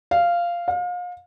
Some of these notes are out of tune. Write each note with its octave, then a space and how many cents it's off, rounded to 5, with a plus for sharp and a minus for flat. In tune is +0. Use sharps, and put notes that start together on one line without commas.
F5 -10
F5 +35